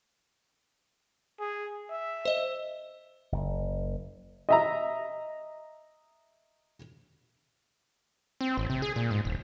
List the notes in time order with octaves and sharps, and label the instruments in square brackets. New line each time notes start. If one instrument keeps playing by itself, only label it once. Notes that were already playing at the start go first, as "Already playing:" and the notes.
[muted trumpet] G#4
E5
[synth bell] C5 D#5
[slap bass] F#1
[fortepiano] D#5 E5 A#5
[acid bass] C4
A1
C3
G#4
A#2
G#2
D#1